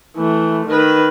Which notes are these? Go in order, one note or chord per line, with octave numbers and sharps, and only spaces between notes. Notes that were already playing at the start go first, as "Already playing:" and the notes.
E3 A3
D#3 B4